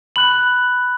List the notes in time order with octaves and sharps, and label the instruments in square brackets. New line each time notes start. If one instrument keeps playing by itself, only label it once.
[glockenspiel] B5 F#6 F#7